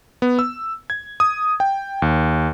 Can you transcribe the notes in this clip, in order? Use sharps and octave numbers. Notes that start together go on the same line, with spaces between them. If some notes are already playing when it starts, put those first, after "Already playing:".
B3
E6
G#6
D#6
G5
D#2